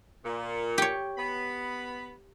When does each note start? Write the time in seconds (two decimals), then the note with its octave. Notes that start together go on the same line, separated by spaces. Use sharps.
0.25 A#2
0.78 G4 C#5
1.18 B3 B5